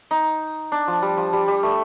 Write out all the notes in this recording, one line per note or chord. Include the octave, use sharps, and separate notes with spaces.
D#4
D4
F3
G3
F3
G3
G3
A3